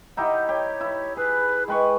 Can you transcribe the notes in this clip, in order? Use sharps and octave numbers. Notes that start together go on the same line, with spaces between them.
D#4 E4 G4 F#5
G4 C#5
E4
G#4 B4
G#3 B4 G5 C#6